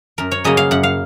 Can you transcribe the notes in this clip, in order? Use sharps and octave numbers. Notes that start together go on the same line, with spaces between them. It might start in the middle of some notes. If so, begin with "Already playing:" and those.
F#2 A#4
C#5
C#3 F#3 A#3 D#5
F5
F#2 F#5
F5